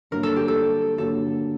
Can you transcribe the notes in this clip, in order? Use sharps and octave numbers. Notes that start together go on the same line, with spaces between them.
G2 D3 F#3 A#3 F#4 A#4
A4
G4
A4
G2 D3 F#3 A#3 F#4 A4